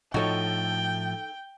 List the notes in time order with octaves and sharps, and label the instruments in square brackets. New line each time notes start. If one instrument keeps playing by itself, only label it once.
[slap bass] A2 F3 [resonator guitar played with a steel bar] D#4 A4 [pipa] F#4 C#5 [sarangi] G5